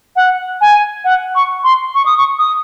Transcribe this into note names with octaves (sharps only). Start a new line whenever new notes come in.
F#5
G#5
F#5
C#6
C6
C#6
D#6
C#6
D#6